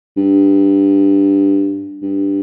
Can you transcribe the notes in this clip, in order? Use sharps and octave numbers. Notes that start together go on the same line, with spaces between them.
G2
G2